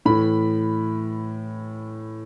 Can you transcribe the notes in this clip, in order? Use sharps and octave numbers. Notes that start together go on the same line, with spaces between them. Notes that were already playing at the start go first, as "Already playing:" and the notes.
A2 E3 B5